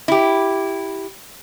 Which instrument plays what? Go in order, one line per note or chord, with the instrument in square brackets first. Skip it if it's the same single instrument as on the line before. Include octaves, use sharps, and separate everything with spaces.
[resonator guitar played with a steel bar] E4 G4